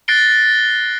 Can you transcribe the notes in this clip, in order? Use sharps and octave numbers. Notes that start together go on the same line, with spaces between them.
F#6 A6 A#6 C7 D7 G7